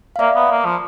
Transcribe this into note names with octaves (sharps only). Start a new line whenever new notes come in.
F5
A#3 D5 E5
B3
A#3
F3